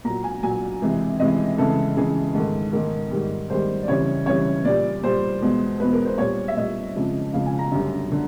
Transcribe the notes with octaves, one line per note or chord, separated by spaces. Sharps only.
A#2 F#3 A#5
G#5
A#2 F#3 G#5
F2 C3 E3 G#3
F2 C3 E3 G#3 D#5
F2 C#3 E3 G#3 A4
F2 C#3 E3 G#3 G#4
G#2 D#3 G#3 A4
G#2 D#3 G#3 A#4
G#2 D#3 G3
G#2 D#3 G3 C5
D5
F2 C#3 E3 G3 C#5
F2 C#3 E3 G3 C#5
A#2 G3 D5
A#2 G3 C5
E2 B2 G#3
E2 B2 G#3 B4
A#4
C5
A#2 G3 C#5
E5
A#2 G3 D#5
F2 C#3 F3 G#3
F2 C#3 F3 G#3 F5
G#5
A#5
F#2 D3 G3
D3